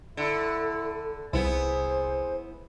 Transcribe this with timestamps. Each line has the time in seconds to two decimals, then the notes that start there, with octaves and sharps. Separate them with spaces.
0.17 D3 E4 A4
1.33 C2 B3 E4 G#4 C5